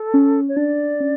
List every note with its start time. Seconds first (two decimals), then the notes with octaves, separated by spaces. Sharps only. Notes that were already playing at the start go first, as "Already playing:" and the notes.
Already playing: A4
0.14 C#4
0.49 C#5
0.56 D4 D5
1.00 C#4